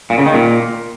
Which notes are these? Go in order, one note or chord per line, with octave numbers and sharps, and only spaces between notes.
A#2
C#3
D#3
A#2